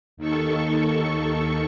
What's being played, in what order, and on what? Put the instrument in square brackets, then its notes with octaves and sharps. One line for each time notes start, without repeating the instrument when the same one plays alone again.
[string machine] D#2 D#3 A4 C#6